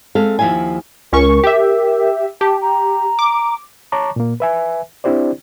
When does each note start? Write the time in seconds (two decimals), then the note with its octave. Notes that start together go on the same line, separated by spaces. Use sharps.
0.15 G#3 C4 A4 E5 F5
0.39 D#2 F3 A#3 E4 F5 G#5
1.13 C#2 C#4 A#4 C#6
1.44 G4 E5
2.41 G4 A5
2.62 A#5
3.19 D6
3.92 C#5 A5 A#5 C#6 D6
4.16 A#2 A#3
4.40 B4 E5 G#5
5.04 C4 D4 E4 G4 C5 D5